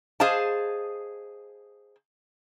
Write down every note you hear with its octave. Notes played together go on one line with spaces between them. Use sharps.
G#4 C5 D#5 F5 A5